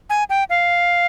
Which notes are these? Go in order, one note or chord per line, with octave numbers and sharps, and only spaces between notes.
G#5
G5
F5